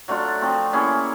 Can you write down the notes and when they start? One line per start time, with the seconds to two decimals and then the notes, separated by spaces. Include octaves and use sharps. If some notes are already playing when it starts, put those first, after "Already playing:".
0.08 F#3 A3 D4 F4
0.41 F3 A3 C4
0.73 A#3 C#4 E4 G#4